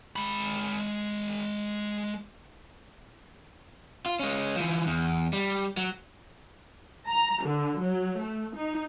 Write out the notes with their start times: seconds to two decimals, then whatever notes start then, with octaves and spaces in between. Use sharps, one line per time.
0.16 G#3 B5
4.06 F4
4.19 G#3 C#4
4.56 E3 F3
4.87 E2
5.33 G3
5.77 F#3
7.07 A#5
7.43 D3
7.81 F#3
8.19 A3
8.56 D#4